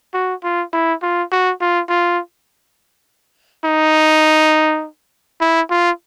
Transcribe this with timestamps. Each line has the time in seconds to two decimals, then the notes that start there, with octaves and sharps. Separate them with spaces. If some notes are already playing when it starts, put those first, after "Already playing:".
0.14 F#4
0.43 F4
0.73 E4
1.02 F4
1.32 F#4
1.61 F4
1.89 F4
3.65 D#4
5.41 E4
5.70 F4